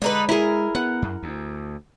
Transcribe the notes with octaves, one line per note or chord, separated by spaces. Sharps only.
D3 G#3 D#4 B4
E4 G#4 A#4
B3 F#5
F#2
D2